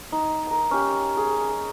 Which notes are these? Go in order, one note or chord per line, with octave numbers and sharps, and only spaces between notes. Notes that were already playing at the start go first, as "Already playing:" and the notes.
D#4
A#4 D#6
C#4 G4
G#4